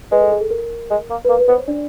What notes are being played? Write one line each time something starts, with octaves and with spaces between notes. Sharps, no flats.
G#3 B4
A4
G#4
A4
A#4
G#3
A#3
B4
A#3 A#4
B4
B3 C5
C#5
D4 D5